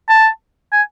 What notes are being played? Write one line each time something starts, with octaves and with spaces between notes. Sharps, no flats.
A5
G#5